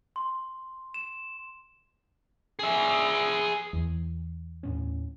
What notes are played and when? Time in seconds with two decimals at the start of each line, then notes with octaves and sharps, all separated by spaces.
0.16 C6
0.94 E7
2.59 G#4 E5
3.73 E2
4.63 D#2 A2 C#4